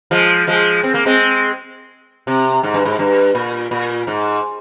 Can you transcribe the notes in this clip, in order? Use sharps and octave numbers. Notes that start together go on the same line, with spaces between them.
F3 G#3
F3 G#3
C4
A#3
G#3 C4
C3
G#2
G2
G#2
G2
A#2
A#2
G#2